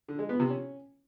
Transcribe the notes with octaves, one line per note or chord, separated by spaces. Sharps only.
D3
G#3
B3
C3
C#4